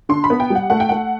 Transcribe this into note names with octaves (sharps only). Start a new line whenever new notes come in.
D3 C6
B5
B3
G5
G3
F#5
A3 F#5
G5
A3 F#5